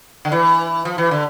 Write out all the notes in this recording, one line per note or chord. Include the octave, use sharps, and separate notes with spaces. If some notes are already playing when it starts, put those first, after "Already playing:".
D3
E3
F3
E3
D3